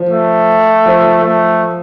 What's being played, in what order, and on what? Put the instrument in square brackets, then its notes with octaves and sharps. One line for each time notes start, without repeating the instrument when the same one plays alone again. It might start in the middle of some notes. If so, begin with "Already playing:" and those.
Already playing: [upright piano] F3
[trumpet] A3
[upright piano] F3
[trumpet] A3